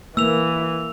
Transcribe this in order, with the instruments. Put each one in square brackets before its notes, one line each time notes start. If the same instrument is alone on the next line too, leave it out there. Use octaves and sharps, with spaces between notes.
[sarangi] E3 [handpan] A#3 [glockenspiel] E6 F7